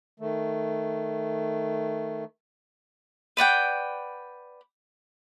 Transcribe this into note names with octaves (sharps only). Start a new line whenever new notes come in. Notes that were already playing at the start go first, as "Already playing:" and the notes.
D#3 A3
B4 D5 F#5 G5